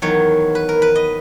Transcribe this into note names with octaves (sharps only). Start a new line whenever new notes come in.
E2 D#3 F#3 C#5
B4
A#4
B4
D#5